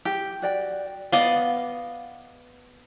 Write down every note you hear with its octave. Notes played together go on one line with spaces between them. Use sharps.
G4
F#4 D5 G5
B3 D5 D#5 F5